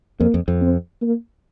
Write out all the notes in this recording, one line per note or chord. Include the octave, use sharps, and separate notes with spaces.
F2 A#3
F2
F2
C4
A#3